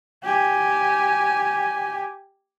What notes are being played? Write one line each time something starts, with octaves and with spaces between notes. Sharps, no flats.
G4 G#5